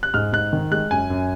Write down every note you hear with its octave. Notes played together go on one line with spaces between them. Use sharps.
F#6
G#2 F6
G#2 F#6
D#3
G#3 F#6
F#2 G#5
F#2